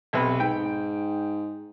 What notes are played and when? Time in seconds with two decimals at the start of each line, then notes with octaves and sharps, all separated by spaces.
0.13 B1 C3 B4
0.40 G#2 G5